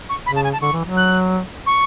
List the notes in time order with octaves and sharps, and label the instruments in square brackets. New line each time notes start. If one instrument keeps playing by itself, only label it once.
[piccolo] C#6
[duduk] C#3 [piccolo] B5
[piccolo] A5
G#5
A5
[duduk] D3 [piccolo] C#6
[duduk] E3
F#3
[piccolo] F#6
C#6